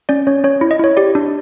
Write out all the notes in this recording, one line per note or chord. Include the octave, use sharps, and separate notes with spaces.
C#4 D5
C#4 C#5
C#4 C#5
E4
D#5
E4 C#5
G4 D5
D4